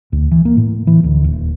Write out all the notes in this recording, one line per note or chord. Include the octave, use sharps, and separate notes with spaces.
D2
E3
A#3
A2
E3
D2
D#1